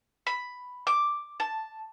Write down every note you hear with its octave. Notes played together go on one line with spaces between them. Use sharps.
B5
D6
A5